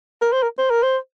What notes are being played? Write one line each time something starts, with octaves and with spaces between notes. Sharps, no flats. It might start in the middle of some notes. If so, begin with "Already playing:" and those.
A#4
C5
A#4
C5
A#4
C5